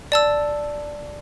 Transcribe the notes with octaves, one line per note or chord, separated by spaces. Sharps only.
D5 A5 E6